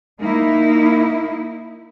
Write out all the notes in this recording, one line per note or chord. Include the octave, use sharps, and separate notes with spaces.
A#3 D#4 E4